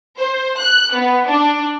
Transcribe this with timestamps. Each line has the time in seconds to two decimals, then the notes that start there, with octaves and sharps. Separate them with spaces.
0.18 C5
0.59 F#6
0.94 B3
1.27 D4